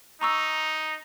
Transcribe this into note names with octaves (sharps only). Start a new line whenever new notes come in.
D#4 A#5 C#6 E6